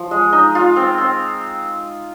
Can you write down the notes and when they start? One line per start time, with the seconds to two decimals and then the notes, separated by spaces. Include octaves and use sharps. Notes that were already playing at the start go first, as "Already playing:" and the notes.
Already playing: F3
0.11 G#3
0.33 D#4
0.55 F4
0.76 C4
0.98 C4